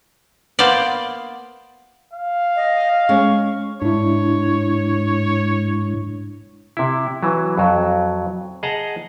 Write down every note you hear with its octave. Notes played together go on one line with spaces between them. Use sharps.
A#3 B3 C5 D5
F5
D#5
G#3 C#4 C#6
G#2 D4 E4 C#5
C3 E4
E3 F#3
F2 F#3
G#4 D#5 F#5 A5 A#5